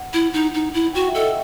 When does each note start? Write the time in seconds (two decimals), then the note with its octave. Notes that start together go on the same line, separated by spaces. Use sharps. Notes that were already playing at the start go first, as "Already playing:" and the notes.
Already playing: F#5
0.13 E4
0.33 D#4
0.54 D#4
0.74 E4
0.93 F#4 G5
1.01 F#5
1.08 E5
1.14 A4 D#5